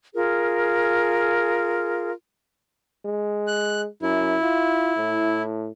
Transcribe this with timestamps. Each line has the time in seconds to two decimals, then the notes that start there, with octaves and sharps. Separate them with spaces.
0.14 F4 G#4 A#4
3.05 G#3
3.47 F#6
4.02 F#2 E4
4.43 F4
4.97 A2